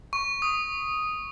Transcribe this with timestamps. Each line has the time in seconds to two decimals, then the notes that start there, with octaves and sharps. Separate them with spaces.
0.13 C#6
0.42 D#6